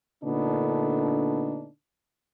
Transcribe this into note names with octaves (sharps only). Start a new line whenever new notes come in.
A#2 D3 A3 B3 D4 D#4